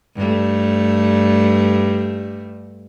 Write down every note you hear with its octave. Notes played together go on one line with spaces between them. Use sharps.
G2 A3